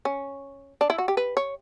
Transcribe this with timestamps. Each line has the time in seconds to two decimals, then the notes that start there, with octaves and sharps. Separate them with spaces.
0.05 C#4
0.81 D4
0.90 E4
0.98 F#4
1.08 G4
1.17 B4
1.37 C#5